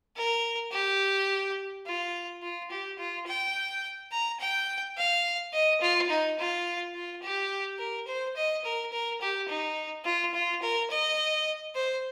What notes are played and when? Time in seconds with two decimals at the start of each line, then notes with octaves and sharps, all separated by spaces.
0.17 A#4
0.72 G4
1.86 F4
2.42 F4
2.71 G4
2.99 F4
3.27 G5
4.12 A#5
4.40 G5
4.97 F5
5.53 D#5
5.81 F4
6.10 D#4
6.39 F4
6.95 F4
7.22 G4
7.79 A#4
8.07 C5
8.36 D#5
8.65 A#4
8.92 A#4
9.21 G4
9.49 D#4
10.05 F4
10.34 F4
10.62 A#4
10.90 D#5
11.75 C5